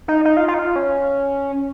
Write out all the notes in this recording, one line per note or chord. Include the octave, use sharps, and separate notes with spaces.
D#4
D#4
F4
F4
D#4
F4
C#4